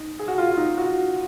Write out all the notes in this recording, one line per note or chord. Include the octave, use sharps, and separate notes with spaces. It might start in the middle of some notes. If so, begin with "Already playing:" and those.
Already playing: D#4
G#4
F#4
F4
F4
D#4
F#4